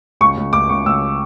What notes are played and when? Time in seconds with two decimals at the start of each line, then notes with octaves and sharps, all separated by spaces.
0.21 C#2 C#6
0.37 C#2
0.53 C#2 D6
0.69 C#2 C#6
0.86 C#2 E6